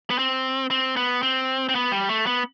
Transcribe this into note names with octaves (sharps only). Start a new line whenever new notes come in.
B3
C4
C4
B3
C4
C4
B3
G3
A3
B3